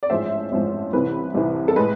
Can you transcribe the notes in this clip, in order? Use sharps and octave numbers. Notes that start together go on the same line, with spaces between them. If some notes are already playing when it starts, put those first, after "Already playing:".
D5
A1 G#2 F3 G#3 C5 E5
A1 G#2 F3 G#3
C2 C3 E3 B4
C2 C3 E3
A4
A2 G#3 B4